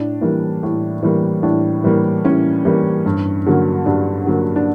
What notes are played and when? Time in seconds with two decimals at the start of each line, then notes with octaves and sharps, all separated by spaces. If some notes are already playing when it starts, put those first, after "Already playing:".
Already playing: A2 D4
0.21 E3 G3 A#3
0.63 A2
1.03 E3 G3 A#3
1.43 A2 D4
1.84 E3 G3 A#3
2.24 A2 C#4
2.65 E3 G3 A#3
3.06 G2
3.46 D3 F#3 A#3
3.86 G2 D4
4.26 D3 F#3 A#3
4.56 D4